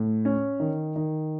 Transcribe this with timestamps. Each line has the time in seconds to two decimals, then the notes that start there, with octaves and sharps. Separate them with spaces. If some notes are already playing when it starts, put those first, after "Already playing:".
Already playing: A2
0.25 C#4
0.60 D#3
0.96 D#3